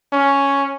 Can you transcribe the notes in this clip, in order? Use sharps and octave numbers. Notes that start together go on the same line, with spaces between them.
C#4